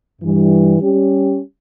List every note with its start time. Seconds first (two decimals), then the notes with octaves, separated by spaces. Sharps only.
0.20 G2 E3 G3
0.79 G3 C#4 G4